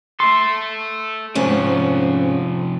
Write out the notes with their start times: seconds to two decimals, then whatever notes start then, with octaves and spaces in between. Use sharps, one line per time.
0.20 A4 E5 C6
1.35 D2 G#2 C3 F3 C#4